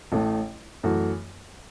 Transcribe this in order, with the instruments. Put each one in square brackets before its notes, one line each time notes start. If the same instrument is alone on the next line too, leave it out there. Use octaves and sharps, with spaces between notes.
[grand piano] A1 A2 A3
F#2 E3 A3 F#4